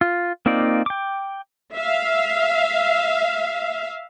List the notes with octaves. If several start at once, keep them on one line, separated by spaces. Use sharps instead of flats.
F4
A#3 C4 D#4 F4 D5
G5 D6
E5 F5